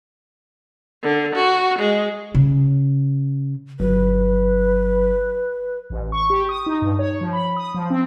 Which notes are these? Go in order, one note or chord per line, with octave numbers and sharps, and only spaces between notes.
D3
F#4
G#3
C#3
G1 F#3 B4
A1
C#6
G4
D#6
D#4
G2
C#5
F3
B5
D#6
F3
C4